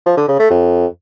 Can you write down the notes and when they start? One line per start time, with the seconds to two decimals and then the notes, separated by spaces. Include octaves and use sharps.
0.06 F3
0.17 D3
0.28 C#3
0.39 A3
0.50 F2